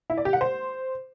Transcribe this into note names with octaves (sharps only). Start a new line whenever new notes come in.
E4
D5
G4
F#5
C5